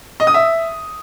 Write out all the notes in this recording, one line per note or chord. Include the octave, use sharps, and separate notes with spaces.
D#5
D#6
E5